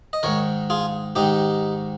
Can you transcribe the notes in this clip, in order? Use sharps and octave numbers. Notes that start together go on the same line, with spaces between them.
D#5
G#2 D#3 A#4 C#5
F4 G#4
G#2 D#3 D#4 G4